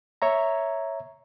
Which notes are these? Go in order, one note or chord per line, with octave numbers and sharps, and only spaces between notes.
C#5 E5 A#5